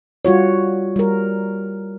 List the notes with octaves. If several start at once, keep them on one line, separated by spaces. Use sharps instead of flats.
G3 F4 F#4 C#5
G3 A#4